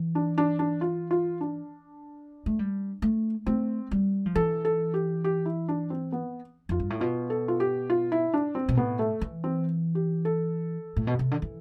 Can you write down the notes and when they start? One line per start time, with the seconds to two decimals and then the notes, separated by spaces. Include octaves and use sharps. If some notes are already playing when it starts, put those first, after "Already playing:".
Already playing: E3
0.15 D4
0.38 D4
0.59 D4
0.81 F4
1.11 F4
1.41 D4
2.46 A3
2.59 G3
3.02 A3
3.46 A3 C4
3.91 G3
4.26 F3
4.35 E3 A4
4.65 A4
4.94 G4
5.24 G4
5.46 E4
5.68 D4
5.90 C4
6.12 B3
6.69 F2 F4
6.80 G2
6.90 A2
7.00 B2 F4
7.30 A4
7.48 F4
7.60 G4
7.90 F4
8.12 E4
8.34 D4
8.55 C4
8.69 B2
8.77 A2 B3
8.99 A3
9.21 E3
9.44 C4
9.95 G4
10.25 A4
10.96 A2
11.07 B2
11.19 C3
11.31 D3
11.42 E3